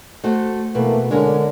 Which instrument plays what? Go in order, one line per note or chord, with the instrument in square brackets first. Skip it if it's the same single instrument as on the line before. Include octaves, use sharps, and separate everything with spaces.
[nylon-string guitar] A3 F#4 C5
[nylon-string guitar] B2 B4 [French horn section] E3 A3 A#3
[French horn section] D3 D4 [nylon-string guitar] G#3 C#4 A#4